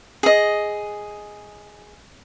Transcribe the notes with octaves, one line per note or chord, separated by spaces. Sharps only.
G#4 D#5